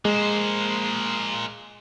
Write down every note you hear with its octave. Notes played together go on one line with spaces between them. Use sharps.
G#3 A#3 C5